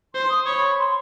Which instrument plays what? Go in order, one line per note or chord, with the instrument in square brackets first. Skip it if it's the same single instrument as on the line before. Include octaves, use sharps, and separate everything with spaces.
[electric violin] C5 [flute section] C6
[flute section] D#6
[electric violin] C#5 [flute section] B5
[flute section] C6